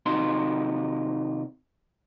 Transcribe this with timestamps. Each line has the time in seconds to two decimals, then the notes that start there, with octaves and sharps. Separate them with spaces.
0.06 C3 D#3 D#4 F4 F#4 C6